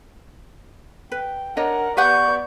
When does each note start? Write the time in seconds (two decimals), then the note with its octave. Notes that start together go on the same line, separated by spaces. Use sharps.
1.12 B4 G5
1.57 D4 A#4 C#5 D#5 F#5
1.97 B3 G4 B4 D5 F#5 C#6 G6